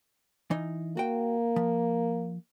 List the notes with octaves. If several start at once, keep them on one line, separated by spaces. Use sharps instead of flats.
E3 D#4
A#3 F#4 G5
F3